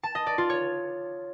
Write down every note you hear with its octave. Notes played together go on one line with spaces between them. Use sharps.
A5
D#5
D5
F4
C#5